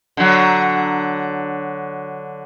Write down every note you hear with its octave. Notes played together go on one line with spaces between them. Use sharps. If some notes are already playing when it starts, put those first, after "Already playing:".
D3 F#3